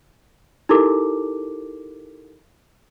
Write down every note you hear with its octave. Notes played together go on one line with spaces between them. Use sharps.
D#4 E4 G4 A4 A#4 D6